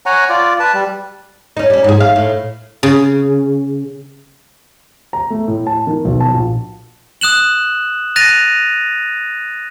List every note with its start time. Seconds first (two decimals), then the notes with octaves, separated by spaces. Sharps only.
0.06 C#5 F#5 G#5 A#5
0.29 F4 D5
0.60 B4 A5
0.74 G3
1.57 C#4 D#4
1.70 G3 C#4
1.84 G#2 G#4
2.00 F5
2.16 A2
2.83 C#3
5.13 A#5
5.30 A3
5.48 A2
5.67 A5
5.87 D#3
6.05 B1
6.20 A5
6.34 A#1
7.21 D#6 F#6 E7 F#7
8.16 F#6 A6 A#6 D#7 F7